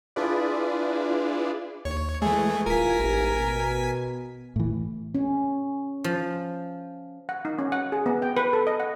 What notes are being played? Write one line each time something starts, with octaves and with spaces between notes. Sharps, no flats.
D4 E4 F4 G#4 B4 D5
D#2 C#5
E3 G#3 A3 G#4
D#1 G2 E3 F4 A#4 G#5 B6
A1 E2 G#2 G4
B2
A2 E3
C#4
F3
F#5
D#4
C#4
F#5
G#4
B3
G5
B4
A4
D#5
F#5